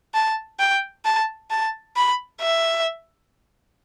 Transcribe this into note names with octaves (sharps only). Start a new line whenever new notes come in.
A5
G5
A5
A5
B5
E5